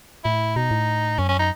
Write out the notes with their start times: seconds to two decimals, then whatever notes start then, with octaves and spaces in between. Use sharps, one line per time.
0.25 A2 E4
0.56 B2 D#4
0.71 A2
1.19 F#2 C#4
1.29 C#4
1.39 D#4